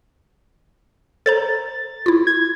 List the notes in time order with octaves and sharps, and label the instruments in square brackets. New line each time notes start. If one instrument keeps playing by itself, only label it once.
[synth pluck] A4 C5 A#5 [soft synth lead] A6
[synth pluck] E4 F4
[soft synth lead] G#6